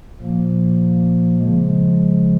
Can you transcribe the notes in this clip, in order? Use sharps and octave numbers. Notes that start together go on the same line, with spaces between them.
A#2 F3 A#3
C#3 F3 G#3